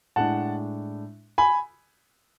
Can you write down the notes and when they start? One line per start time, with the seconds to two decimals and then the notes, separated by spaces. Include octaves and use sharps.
0.16 A2 G#3 D4 F#5 A5
1.38 G#5 B5